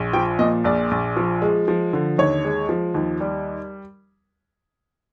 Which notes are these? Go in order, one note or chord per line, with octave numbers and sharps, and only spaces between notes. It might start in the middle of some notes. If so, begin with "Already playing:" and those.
Already playing: A#1
F3 G5
A#2 D#5
A#1 D5
A#1
F3
G#3
F3
D3
D#2 C#5
G#3
F3
D#2
G3